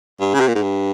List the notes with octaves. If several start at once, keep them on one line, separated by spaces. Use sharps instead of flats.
G2
C#3
C3
A#2
G#2
G2